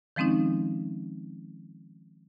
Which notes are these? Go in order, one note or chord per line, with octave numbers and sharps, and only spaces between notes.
D#3 F3 G#3 C4 C#4 D#4